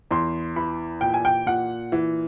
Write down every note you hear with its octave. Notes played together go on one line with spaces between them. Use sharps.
E2 C6
E3 B5
A#2 G5
G#5
G5
A#2 F#5
E3